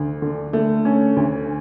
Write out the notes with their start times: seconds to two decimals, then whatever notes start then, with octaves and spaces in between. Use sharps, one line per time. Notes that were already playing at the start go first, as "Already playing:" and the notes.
Already playing: D2
0.22 D3
0.53 A3
0.85 C#4
1.17 D2